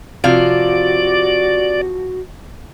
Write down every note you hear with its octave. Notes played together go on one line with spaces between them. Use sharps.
C3 F3 F#4 D5 F5